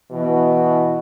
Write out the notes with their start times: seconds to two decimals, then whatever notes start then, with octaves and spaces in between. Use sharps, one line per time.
0.12 B2 E3